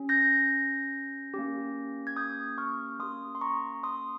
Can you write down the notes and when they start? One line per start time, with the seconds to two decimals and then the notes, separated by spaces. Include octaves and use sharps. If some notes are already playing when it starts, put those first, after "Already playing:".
Already playing: C#4 G4
0.09 G6 A#6
1.34 A#3 C#4 G4
2.07 G#6
2.17 D#6 G6
2.58 C#6 F6
2.99 A#3 C#4 G4 C6 D#6
3.35 C6
3.41 A#5 C#6
3.83 C6 D#6